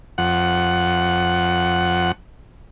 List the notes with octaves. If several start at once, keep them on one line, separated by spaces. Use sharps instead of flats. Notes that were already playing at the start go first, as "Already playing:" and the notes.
F2 F#5